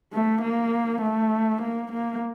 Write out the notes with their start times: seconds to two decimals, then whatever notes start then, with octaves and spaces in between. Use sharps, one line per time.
0.13 A3
0.42 A#3
1.02 A3
1.62 A#3
1.92 A#3